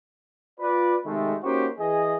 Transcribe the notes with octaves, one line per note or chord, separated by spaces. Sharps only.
F4 B4 D5
C3 D#3 G#3 A3
A#3 C#4 D#4 F#4 G4 C5
E3 G#4 D#5